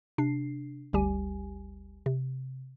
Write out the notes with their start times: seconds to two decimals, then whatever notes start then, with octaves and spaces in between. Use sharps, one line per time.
0.18 C3 D4 C7
0.93 G1 D2 G3 G4 G#5
2.06 C3